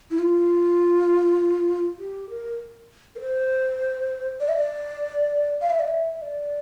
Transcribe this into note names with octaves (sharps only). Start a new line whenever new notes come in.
E4
F4
G4
A#4
A#4
C5
D5
E5
D5
F5
E5
D5
E5
D5